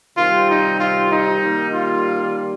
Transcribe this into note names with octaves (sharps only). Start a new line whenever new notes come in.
C3 D#3 G3 C4 F4
D#4
F4
D#4
D#3 G3 A#3
F4